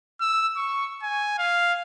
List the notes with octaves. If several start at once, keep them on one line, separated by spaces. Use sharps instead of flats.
E6
C#6
G#5
F5